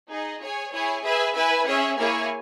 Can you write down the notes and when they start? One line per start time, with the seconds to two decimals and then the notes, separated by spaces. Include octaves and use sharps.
0.10 D#4 G#4 D#5
0.41 G#4 C#5 G#5
0.72 E4 G#4 C#5 G#5
1.04 G#4 B4 E5 G#5
1.35 E4 B4 E5 G#5
1.67 C#4 G#4 C#5 E5
1.98 A#3 E4 G#4 C#5 G#5